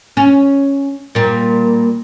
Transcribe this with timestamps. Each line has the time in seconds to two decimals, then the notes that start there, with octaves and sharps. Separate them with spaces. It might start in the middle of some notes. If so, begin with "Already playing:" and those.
0.17 C#4
1.15 A#2 G3